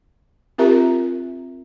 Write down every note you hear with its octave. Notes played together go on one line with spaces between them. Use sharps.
C4 F4 G4 A#4 E5 A#5